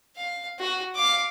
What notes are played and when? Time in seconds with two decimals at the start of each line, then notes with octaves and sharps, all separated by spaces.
0.17 F5
0.59 F#4
0.95 F5 D6